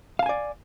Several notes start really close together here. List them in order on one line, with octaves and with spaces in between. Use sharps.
F5 A5 G#5 D5